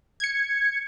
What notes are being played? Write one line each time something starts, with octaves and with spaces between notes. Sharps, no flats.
G#6 C#7